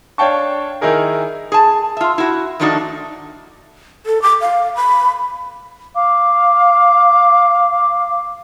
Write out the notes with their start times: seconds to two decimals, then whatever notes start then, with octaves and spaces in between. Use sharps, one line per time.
0.18 D4 C#5 F5 G5 A5 C#6
0.81 D#3 D#4 E4 G#4 A#4
1.52 G#4 A5
1.97 F4 E5
2.18 E4 F#4
2.60 D#3 F3 A3 D4 D#4 F#4
4.06 A4
4.22 D6
4.41 F5
4.76 B5
5.95 F5 D6